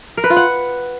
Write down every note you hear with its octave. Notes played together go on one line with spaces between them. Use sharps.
A#4
B4
F4
F#5